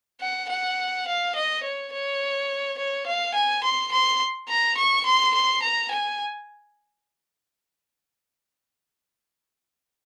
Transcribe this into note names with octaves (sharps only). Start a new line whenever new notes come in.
F#5
F#5
F5
D#5
C#5
C#5
C#5
F5
G#5
C6
C6
A#5
C#6
C6
C6
A#5
G#5